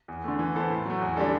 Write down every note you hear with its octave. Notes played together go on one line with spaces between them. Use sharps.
E2
D3 A3
E3
B3 E4 A4 C5
A2
F#3 A3
E2
D3 G3 D4 A4